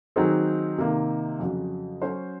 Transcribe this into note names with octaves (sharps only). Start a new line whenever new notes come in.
D#3 F#3 C4 D#4 G#4
C3 D#3 A#3 D#4
F2 C#3 F#3
F#3 C#4 F#4 C5